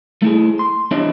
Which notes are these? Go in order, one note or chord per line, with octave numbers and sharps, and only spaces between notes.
A3 E4 G#4
C6
E2 D4 E4 G4 C#5 D#5